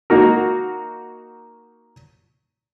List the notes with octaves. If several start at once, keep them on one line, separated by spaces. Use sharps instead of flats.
A#3 D#4 F#4 A#4